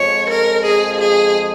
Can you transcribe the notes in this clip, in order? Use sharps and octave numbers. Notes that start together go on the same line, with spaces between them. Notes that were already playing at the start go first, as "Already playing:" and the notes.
Already playing: F2 F3 G#3 C#5
A#4
G#4
G#4